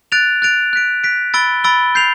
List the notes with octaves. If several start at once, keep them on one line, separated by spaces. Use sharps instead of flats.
F#6 A6 D7 F7
F#6 A6 D7 F7
F#6 B6 D7
F#6 B6 D7
B5 E6 A6 D7 G7
B5 E6 A6 D7 G7
G6 C7 F7